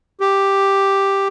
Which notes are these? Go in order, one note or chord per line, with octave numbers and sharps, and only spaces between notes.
G4